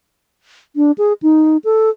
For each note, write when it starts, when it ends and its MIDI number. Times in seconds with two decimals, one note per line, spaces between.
0.76 0.92 62
0.98 1.13 68
1.22 1.57 63
1.64 1.90 69